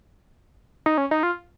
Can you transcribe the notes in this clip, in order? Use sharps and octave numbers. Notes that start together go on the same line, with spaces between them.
D#4
C#4
D#4
F4